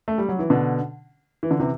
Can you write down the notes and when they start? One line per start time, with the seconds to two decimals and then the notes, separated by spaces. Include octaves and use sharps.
0.08 A3
0.18 G3
0.29 F#3
0.39 E3
0.50 B2 D3
1.43 E3
1.51 D3
1.60 C3 E3